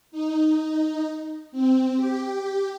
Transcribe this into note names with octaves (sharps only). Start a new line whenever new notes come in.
D#4
C4
G4